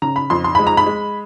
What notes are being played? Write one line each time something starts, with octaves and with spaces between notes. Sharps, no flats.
C#3 A#5
B5
F2 C6
C6
G#3 B5
A#5
B5
G#3